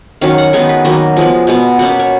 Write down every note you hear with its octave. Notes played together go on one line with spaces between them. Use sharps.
D#3 F#3 C#4 F5
F#5
D#3 G#3 B3 G#5
B4
D#3 F#3 A#3 D#5
F3 G#3 B3
B2 G#3 B3
B2 A#3 C#4 F#5
B4
C#5